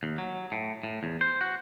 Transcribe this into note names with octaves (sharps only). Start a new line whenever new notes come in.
D#2
F#3
A2
A2
E2
C5
F#4